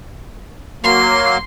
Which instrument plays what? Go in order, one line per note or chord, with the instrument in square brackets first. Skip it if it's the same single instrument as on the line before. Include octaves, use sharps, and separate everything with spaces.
[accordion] F#3 A#3 [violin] C6